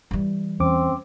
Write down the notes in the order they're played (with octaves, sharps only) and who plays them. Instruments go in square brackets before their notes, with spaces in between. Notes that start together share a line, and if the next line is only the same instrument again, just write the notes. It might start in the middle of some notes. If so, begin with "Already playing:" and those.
[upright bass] E3 G3
[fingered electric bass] E2 [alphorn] C4 [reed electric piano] C#4 D6